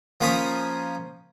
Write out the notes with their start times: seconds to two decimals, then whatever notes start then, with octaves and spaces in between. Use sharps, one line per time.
0.21 F3 A#3 C#4 C#5 B5 D#6